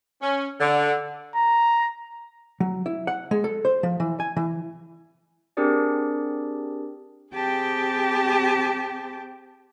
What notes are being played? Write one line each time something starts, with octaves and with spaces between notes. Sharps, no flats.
C#4
D3
A#5
F#3
E4
F#5
G#3
A4
C5
F3
E3
G#5
E3
C4 D4 G4 G#4 A#4 D5
C4 G4 G#4 G5 A5